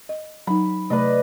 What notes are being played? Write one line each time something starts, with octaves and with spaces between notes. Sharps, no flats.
D#5
F#3 D#4 B5
C3 A3 B4 D5 D#5